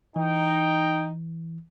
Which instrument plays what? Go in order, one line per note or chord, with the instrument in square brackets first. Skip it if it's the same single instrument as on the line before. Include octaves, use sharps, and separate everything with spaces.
[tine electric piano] E3 [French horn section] D#4 [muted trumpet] G5